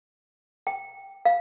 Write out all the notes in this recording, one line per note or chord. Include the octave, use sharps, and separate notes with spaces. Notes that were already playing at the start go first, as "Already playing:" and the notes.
G5
F5